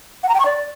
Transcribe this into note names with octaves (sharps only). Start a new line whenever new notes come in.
F#5
A#5
G5
C#6
D5